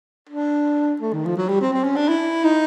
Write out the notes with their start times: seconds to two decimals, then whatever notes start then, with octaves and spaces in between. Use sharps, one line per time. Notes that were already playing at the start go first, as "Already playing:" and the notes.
0.29 D4
1.01 A3
1.13 D#3
1.25 F3
1.37 F#3
1.49 G3
1.61 C4
1.73 C4
1.84 C#4
1.96 D4
2.09 E4
2.44 D#4